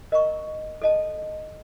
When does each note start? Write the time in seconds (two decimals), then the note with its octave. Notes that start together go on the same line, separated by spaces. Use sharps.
0.12 A#4 D#5 A#5 C#6
0.82 A4 D#5 A5